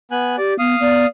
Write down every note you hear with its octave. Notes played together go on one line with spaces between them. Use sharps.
B3 G#5 F#6
G4 D5
B3 F5 D#6
B3 D5